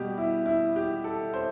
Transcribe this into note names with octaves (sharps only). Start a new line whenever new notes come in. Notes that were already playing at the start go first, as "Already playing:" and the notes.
Already playing: B2 G3 G4
E4
E4
G4
A4
C5